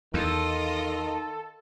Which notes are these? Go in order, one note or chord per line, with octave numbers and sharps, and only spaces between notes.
E2 D#3 F4 A4 D#5